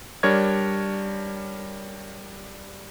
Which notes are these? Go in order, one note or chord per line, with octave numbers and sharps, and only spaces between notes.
G3 D4 A#4 C#5 C#6 G#6